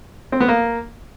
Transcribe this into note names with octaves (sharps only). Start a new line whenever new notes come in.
C4
B3
A#3